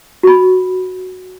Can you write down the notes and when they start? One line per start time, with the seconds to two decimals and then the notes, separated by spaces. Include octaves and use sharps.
0.23 F#4 B5